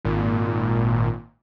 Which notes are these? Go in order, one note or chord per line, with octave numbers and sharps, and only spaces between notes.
G#1 A#2